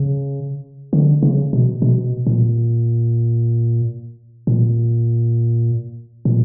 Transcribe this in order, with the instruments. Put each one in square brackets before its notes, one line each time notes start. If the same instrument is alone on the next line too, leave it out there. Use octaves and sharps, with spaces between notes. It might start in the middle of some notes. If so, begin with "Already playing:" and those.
Already playing: [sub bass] C#3
D3
C#3
B2
B2
A#2
A#2
A#2